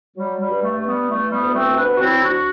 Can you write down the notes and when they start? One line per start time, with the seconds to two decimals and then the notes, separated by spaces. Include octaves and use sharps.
0.17 F#3 G3
0.40 G3
0.48 G2
0.63 A3
0.78 G2
0.86 G3 B3
1.09 E3 A3
1.32 G3 B3
1.39 D2
1.55 A3 C4
1.70 D2
1.77 B3 D4
1.96 F#4
2.01 F#3 C4 E4
2.24 D4 F#4